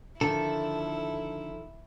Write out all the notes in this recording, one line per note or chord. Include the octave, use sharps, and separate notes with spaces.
D3 D#3 F3 E4 A4